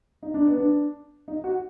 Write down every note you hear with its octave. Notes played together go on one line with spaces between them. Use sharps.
D#4
D4
B3
D4
D#4
F#4